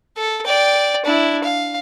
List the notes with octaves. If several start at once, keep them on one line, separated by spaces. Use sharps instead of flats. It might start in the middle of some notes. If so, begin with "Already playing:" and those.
A4
D5 G5
D4 E4
F5